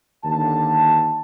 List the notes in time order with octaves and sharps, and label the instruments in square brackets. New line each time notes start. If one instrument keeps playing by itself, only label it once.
[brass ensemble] D#2 D3 A5